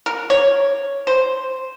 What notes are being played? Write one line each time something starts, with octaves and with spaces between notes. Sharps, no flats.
A#4
C#5
C5